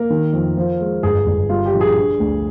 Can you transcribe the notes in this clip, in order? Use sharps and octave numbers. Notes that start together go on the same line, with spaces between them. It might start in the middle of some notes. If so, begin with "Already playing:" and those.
Already playing: A#3 A#4
D#3
F2
F3
G#3
G1 G#4
G1
G3 F4
G4
A#1
G#4
D3
D2